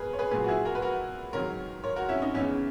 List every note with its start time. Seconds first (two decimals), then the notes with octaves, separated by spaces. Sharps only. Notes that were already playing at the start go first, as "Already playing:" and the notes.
Already playing: B2 G#4 A#4 B4
0.13 C#5
0.19 G#4 B4
0.31 A#2 F#3 G#4 B4
0.44 F#4
0.48 E4 G#4
0.65 F#4 A#4
0.75 B4
0.82 F#4 A#4
1.33 G#2 D#3 F#3 A#4 C#5
1.84 A#4 C#5
1.96 F#4 A#4
2.09 C#4 E4
2.22 D#4
2.34 E2 C#3 E3 C#4